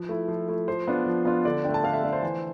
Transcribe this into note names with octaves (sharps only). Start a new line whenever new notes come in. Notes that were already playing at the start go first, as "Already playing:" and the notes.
Already playing: F3 B4
A3 E4
F3
A3 E4
F3 C5
B3 D4 F4
F3
B3 D4 F4
D3 D5
A3 D4 G5
A5
D3 F5
E5
A3 D4
C5
E3